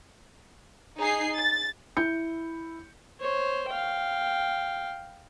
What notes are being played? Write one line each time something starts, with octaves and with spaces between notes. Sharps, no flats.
D#4 G#4 C7
A6
E4 G6 C#7
C5 C#5
F5 G5